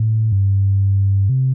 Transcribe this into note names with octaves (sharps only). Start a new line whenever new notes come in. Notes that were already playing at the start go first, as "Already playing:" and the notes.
Already playing: A2
G2
C3